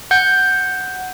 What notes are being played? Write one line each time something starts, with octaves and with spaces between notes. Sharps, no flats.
F#5 G6